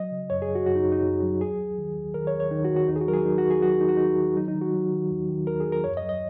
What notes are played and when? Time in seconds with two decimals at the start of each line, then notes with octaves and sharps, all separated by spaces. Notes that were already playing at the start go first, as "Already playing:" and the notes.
Already playing: F#3 D#5
0.11 C#3
0.30 F#2 C#5
0.42 G#4
0.48 F#2
0.55 F#4
0.66 F#2 F#4
0.76 D#4
0.85 F#2
0.92 D#4
1.04 F#2
1.23 F#3
1.41 D#2 G#4
1.60 D#2
1.78 D#3
1.96 D#2
2.14 D#3 A#4
2.27 C#5
2.33 D#2
2.40 C#5
2.51 D#3 D#4
2.65 F#4
2.71 D#3
2.76 F#4
2.88 D#2 D#4
2.96 G#4
3.01 F#4
3.07 F#3 A#4
3.13 G#4
3.25 F#3 D#4
3.38 F#4
3.44 D#2
3.51 G#4
3.62 F#3 F#4
3.81 D#2 D#4
3.89 F#4
3.97 D#2 D#4
4.18 D#3
4.36 F#3 D#4
4.48 D#4
4.55 D#3
4.61 F#4
4.73 F#3
4.92 D#3
5.11 D#2
5.29 D#3
5.47 D#2 A#4
5.60 G#4
5.66 D#2
5.72 A#4
5.84 F#2 C#5
5.97 D#5
6.03 F#3
6.09 D#5